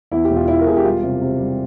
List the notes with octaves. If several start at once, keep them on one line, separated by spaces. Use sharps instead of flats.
E2 E4
G4
E1
F4
E3 E4
A#4
E1 G#4
G4
G3 F4
C3
C3
G3